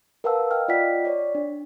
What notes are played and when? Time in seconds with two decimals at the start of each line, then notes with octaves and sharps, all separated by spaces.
0.24 A#4 B4 F5 F#5 A5 E6
0.51 D#5 F5 G5 F6
0.68 F4 D5 D#5 F#5 G5 B6
1.05 C#5 D5
1.35 D4